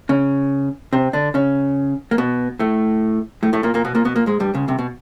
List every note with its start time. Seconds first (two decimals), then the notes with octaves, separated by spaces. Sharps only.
0.09 C#3 C#4
0.93 C3 C4
1.13 D3 D4
1.34 C#3 C#4
2.11 A#3
2.18 B2 B3
2.59 A2 A3
3.43 A2 A3
3.53 A2 A3
3.63 A#2 A#3
3.74 A#2 A#3
3.85 B2 B3
3.95 A#2 A#3
4.05 B2 B3
4.16 A#2 A#3
4.26 G#2 G#3
4.40 G2 G3
4.54 C#2 C#3
4.68 C2 C3
4.79 B2